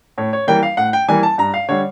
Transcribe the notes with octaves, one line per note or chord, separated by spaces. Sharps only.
A2 C#5
C#5
E3 G3 A#3 G5
F5
A2 F#5
G5
E3 G3 A#3 G#5
A5
G2 A#5
F5
D3 G3 C#5